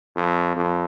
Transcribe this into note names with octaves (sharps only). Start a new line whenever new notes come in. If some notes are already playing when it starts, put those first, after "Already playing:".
F2
F2